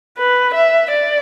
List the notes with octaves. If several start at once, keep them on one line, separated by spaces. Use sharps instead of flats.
B4
E5
D5